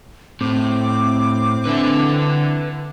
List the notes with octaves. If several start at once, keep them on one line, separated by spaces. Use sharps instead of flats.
A2 C4 D6
D3 B4 E5